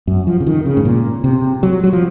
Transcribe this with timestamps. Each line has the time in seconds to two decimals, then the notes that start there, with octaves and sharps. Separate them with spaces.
0.07 F#2
0.27 F3
0.40 C#3
0.47 D#3
0.66 C#3
0.77 G#2
0.85 A#2
1.24 C3
1.63 F#3
1.84 F#3
1.93 F3